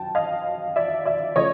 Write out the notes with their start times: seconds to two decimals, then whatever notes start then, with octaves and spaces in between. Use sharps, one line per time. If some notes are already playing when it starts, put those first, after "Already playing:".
Already playing: F#2 G5 A5
0.15 D#5 F5
0.76 D5 E5
1.06 D5 E5
1.36 C#3 F3 A3 C#5 D#5